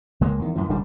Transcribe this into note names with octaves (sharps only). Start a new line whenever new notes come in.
C#2 G#3 A#3
E2 D#3
F#2 A2 E3
E1 C#2 G3 D4